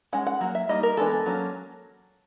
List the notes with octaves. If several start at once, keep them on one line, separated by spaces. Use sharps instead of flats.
G#3 C#4 F#5
F#5
F#3 A#3
E5
G3 A#3 D#4 D#5
A#4
E3 G#3 B3 D4 A4
F#3 A#3 C#4